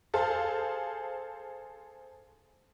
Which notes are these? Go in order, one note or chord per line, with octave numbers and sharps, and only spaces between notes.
G#4 A4 C5 F5